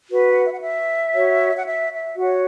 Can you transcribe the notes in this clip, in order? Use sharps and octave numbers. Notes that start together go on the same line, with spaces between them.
F#4 B4
F#5
E5
F#5
E5
F#4 C#5
F#5
E5
E5
F#4 C#5 F#5